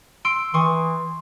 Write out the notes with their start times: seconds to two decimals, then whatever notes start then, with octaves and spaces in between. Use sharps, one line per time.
0.25 C6 E6 D7
0.54 E3 C6 C#6 D#6